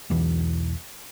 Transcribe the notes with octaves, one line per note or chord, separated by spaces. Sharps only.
E1 B1 E2 E3